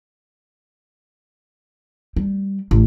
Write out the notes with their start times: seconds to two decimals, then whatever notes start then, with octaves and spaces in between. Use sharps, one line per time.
2.16 G3
2.71 A1